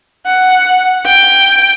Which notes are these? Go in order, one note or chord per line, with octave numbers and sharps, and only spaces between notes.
F#5
G5